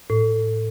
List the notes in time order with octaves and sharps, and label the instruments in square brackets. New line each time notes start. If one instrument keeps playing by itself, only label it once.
[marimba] A2